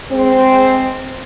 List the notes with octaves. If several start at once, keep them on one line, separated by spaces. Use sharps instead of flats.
G#3 C4